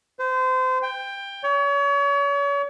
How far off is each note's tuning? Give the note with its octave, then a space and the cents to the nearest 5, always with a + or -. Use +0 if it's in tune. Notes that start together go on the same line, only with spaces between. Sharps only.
C5 -30
G5 +15
C#5 +35